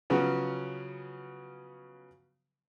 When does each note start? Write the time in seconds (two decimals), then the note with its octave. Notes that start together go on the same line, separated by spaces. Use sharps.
0.10 C#3 F3 F#3 B3 C#4 F#4